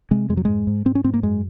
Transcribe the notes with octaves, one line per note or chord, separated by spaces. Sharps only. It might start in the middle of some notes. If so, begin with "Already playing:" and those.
C3 G#3
F2 G#3
F#3
G#2 G#3
G#2
G#2 C4
C#4
G#2 C4
A#3
F#2 G#3